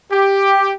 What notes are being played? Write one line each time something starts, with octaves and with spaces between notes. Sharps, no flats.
G4